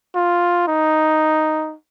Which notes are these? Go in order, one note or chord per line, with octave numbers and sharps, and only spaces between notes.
F4
D#4